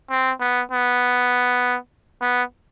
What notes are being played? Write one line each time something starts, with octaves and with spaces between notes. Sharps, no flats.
C4
B3
B3
B3